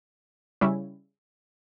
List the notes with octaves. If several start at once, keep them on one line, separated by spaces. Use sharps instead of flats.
C#3 G3 C#4 E4